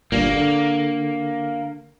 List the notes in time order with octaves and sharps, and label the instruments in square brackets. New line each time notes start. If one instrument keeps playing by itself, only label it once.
[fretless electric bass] G1 G2 A#2 [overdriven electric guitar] A#3
[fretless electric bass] D3